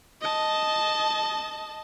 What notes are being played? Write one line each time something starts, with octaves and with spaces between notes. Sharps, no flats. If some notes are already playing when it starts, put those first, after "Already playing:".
D#5 A5